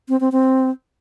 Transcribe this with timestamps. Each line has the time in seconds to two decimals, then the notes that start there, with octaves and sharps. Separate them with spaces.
0.09 C4
0.20 C4
0.32 C4